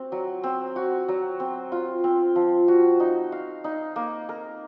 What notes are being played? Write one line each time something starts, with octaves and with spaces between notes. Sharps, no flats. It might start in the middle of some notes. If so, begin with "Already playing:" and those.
Already playing: C4 F#4
F#3
C4
F#4
F#3
C4
F4
C4
F3
F#4
D#4
F5
D#4
A#3
A#4